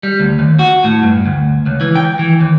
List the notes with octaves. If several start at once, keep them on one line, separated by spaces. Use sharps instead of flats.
G3
D2
D#2
F#4
A2
G2
D2
C#2
E3
G5
E3
D#2